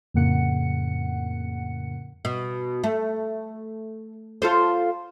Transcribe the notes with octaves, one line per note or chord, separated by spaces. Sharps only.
F2 A2 C#3 A#3 F#5 C#7
B2
A3
F4 A4 C5